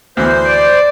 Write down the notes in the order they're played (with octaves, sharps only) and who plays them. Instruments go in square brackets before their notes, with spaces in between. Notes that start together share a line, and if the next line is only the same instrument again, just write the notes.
[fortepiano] D2 E3 [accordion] C5
[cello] D5